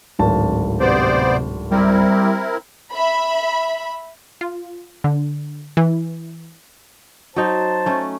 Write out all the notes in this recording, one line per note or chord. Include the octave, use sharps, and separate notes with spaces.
D1 G#1 A5
C3 B3 C5 D5
G3 C4 E4 A#4
E5 B5
F4
D3
E3
F#3 D#4 C5 A5
A3 C#4